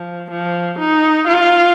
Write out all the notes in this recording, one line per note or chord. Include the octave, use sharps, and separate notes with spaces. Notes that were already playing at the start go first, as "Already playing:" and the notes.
Already playing: F3
F3
D#4
F4